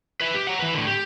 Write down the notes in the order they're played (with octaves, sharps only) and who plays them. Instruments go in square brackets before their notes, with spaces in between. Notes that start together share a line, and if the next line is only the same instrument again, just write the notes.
[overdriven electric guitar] B4 E5
G4
F#5 A#5
E3 B4
A2 D3
G4